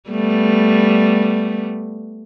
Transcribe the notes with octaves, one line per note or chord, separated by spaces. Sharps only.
G3 A3 B3